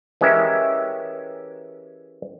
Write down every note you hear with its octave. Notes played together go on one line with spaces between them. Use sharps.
E3 G#3 C#4 G4 A#4 E5